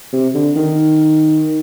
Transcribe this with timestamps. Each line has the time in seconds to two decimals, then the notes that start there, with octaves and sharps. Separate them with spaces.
0.13 C3
0.34 D3
0.56 D#3